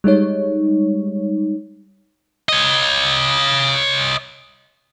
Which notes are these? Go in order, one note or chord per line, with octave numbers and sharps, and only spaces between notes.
G3 G#3 D#4 C#5
C#5 D#5